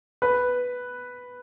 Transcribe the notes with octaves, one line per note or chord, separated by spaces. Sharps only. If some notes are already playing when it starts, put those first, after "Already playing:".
B4